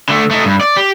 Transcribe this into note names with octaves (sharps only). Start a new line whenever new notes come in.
D3 A3
A3 D#4
G2
D5
G4